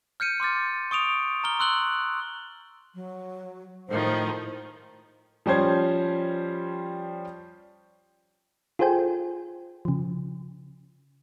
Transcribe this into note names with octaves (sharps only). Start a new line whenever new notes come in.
F6 G6 C#7 D#7
C6 D6 F6 A6
C#6 D#6 D7 F7
A#5 F6 G7
C6 E6 F#6 F#7 G7
F#3
A2 D#3 F3 C5
F3 G3 C#4 C5 G#6
F4 G#4 A4 C5 G5 G#5
C#3 F3